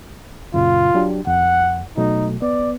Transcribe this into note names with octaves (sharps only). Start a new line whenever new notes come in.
F#2 A#2 C#3 F4
F#3 D4 G4
F2 F#5
B2 F#3 A3 D#4
B3 D5